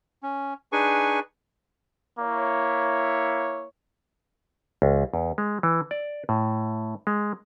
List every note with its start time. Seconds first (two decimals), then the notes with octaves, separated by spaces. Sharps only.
0.23 C#4
0.72 D4 D#4 G#4 B4 G#5 C#6
2.19 A#3 E4 C#5
4.82 C#2
5.14 E2
5.38 G#3
5.63 E3
5.91 D5
6.29 A2
7.07 G#3